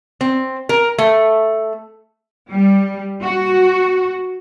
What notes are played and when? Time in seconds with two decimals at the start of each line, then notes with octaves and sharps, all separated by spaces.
0.21 C4
0.69 A#4
0.98 A3
2.50 G3
3.23 F#4